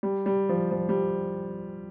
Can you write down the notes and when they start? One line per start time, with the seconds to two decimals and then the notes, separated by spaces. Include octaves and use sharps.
0.03 G3
0.26 G3
0.49 F3
0.71 F3
0.89 G3